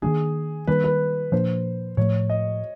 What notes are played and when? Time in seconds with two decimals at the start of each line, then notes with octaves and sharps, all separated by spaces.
0.02 D#3 F#3 A#3 D4 G#4
0.67 D#3 G3 A#3 D4 B4
0.84 B4
1.32 A#2 F3 A#3 D4 C5
1.97 A2 F3 A3 C#5
2.30 D#5